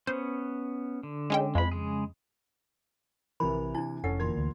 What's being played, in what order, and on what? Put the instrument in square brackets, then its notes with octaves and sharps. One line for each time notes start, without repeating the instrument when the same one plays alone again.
[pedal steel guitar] B3 C#4 [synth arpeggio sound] C5
[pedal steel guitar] D3
[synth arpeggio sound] G#3 C#4 G5
[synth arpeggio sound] F2 [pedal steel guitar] G#3 B5
[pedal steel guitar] C#3 G#3 G#4
[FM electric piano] A#1 A#4 [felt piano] C3 E3 [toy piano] B5
[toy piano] D4 E4 [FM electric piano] G#5
[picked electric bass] F1 [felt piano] C#4 A4 [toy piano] F#5
[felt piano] A#2 C6 G#6 [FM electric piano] D3 E3 A#4
[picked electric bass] D2